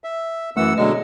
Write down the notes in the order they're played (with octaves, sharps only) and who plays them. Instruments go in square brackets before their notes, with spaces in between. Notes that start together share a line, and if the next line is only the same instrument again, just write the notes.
[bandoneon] E5
[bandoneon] F#2 E3 E6 [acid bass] A3 [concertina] F#5
[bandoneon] B2 D3 F#3 [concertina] G#3 [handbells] D#5